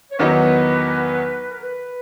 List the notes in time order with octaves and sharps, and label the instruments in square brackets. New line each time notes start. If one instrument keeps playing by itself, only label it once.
[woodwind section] C#5
[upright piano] E2 D#3 F#3 B3 D#4 [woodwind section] B4
[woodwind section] A#4
B4